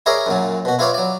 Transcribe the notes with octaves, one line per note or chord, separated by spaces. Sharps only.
E4 G#4 A#4 C#5 D5 E5
F#2 A#2 F#3
B2 F#4
E4 F4 B4 C#5 D5 E5
F#3 D5